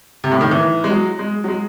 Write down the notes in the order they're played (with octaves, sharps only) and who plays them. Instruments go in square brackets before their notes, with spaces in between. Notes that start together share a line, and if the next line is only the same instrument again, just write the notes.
[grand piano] C3
A2
D#3
E3
G#3
F#3
G#3
F#3
G#3